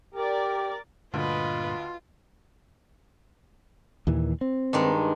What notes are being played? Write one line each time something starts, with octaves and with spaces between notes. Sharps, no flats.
G4 A#4 D5
D2 G2 A#2 D3 F4 B4 D#5
D#2 A#2 E3
C4
G2 D#3 G#3